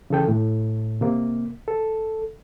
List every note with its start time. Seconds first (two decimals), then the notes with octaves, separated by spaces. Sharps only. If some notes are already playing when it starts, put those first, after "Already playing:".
0.10 C#3 E3 A4 G5
0.28 A2
1.01 C3 A#3
1.68 A4